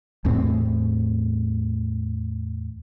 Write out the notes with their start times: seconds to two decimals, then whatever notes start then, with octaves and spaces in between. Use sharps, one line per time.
0.25 E2 A2 C4